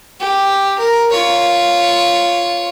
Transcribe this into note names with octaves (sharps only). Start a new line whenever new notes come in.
G4
A#4
F4 C#5